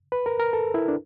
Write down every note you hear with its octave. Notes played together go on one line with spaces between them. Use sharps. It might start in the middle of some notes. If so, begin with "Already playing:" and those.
B4
A#4
A#4
A4
E4
D4